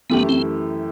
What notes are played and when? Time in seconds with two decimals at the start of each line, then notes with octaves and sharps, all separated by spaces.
0.10 F#2 E3 A3 B3 E4 G4
0.29 C4